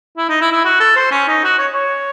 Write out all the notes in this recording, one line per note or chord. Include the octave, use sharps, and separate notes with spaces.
E4
D#4
E4
E4
F#4
A4
C5
C#4
D#4
F#4
C#5
C#5